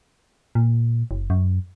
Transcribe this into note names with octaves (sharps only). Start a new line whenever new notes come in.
A#2
F#1
F#2